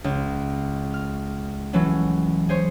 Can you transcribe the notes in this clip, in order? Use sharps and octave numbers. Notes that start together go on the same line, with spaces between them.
C#2
F6
E3 F#3 A3 C#4
G#4 C5 C#5